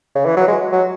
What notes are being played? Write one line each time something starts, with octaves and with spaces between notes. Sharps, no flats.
C#3
E3
F#3
G#3
F#3